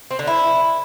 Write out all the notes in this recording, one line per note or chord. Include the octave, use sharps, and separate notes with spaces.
C4
D3
E4